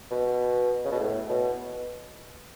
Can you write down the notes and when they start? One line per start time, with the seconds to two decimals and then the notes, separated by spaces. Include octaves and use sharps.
0.11 B2
0.84 C#3
0.92 B2
1.00 A2
1.29 B2